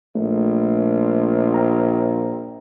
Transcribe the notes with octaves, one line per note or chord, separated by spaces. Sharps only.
A#1 A3
G5 A#5